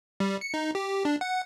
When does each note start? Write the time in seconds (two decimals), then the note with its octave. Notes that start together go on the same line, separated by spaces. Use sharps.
0.20 G3
0.41 C#7
0.54 D#4
0.75 G4
1.05 D4
1.21 F#5